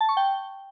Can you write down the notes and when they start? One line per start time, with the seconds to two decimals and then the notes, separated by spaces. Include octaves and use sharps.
0.01 A5
0.09 C#6
0.17 G5